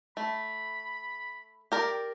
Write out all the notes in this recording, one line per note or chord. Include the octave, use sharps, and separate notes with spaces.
A3 B5
G4 A#4 D5